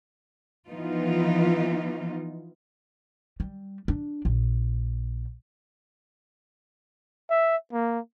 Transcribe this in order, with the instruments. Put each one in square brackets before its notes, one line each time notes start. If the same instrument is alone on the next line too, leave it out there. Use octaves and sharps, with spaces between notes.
[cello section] E3 F3 B3 D#4 F4
[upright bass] G3
D4
A#1
[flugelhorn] E5
A#3